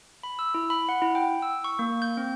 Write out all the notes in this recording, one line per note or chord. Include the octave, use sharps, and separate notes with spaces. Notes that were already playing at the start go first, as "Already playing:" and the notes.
B5
E6
E4
B5
F#5
E4
G5
E6
C#6
A#3
G6
C4